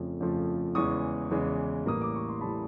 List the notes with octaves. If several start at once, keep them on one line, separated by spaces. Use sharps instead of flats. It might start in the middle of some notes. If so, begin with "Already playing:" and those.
Already playing: F2 C#3 F3 A3
F2 C#3 F3 A3
E2 C#3 E3 G#3 C#6 D#6
E2 C#3 E3 G#3
A1 A2 E3 G3 A#3 D#6
D6
C#6
C6
A2 E3 G3 A#3 A5 B5